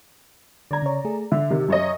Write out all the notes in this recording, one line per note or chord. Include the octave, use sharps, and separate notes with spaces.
D3 D5 A#5 G#6
C#3 C#5
A3 G#4
D3 E5
C3 D#3
F#2 C#5 D#5